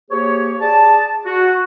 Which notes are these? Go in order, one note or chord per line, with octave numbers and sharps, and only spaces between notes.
A#3 G4 G#4 C5 C#5
G#4 D5 A5
F#4